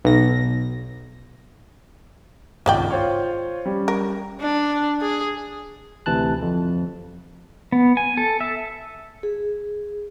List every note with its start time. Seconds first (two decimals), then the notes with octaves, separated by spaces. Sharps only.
0.05 B1 A#6
2.66 G#1 C#2 G#3 D5 G5
2.90 F4 C5 C#5
3.65 G3 C#4
3.88 A#4
4.41 D4
5.02 G#4
6.06 D2 C3 E3 A5 F#6
6.42 F2
7.72 B3
7.97 G#5
8.17 A4
8.41 E5
9.23 G#4